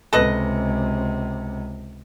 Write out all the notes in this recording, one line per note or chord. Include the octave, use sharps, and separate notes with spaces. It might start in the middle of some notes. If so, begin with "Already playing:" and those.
C#2 C3 A4 B4 D#5